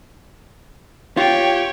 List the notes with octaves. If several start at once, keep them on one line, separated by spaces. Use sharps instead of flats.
F4 G4 C#5 G5